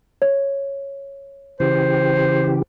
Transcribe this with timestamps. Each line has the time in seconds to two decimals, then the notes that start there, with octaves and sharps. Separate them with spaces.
0.22 C#5
1.60 C#3 E3 G4 C5